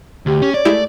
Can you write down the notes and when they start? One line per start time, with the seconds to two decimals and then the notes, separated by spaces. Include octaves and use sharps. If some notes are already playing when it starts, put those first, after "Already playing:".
0.26 D2 G4
0.42 C#4
0.54 C#5 D5
0.65 G#3 A3 E4 G4